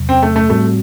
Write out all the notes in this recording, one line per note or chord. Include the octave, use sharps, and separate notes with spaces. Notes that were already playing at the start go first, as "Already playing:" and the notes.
Already playing: E2 C3 F#3
C4
A3
A3
A2 G3 A3 C4 F#4